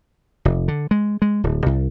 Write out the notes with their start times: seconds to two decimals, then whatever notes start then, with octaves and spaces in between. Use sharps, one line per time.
0.45 F1
0.68 D3
0.91 G#3
1.22 G#3
1.44 D1
1.66 C2